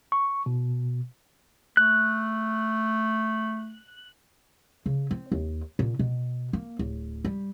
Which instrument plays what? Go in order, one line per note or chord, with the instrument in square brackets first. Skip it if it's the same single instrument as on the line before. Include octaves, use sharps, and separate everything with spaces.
[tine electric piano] C#6
B2
[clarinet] A3 [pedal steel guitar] F#6
[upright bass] C#3
C4
D#2
A#2
B2
A#3
D1
G3